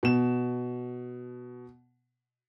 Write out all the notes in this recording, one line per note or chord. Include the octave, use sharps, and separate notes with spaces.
B2 E7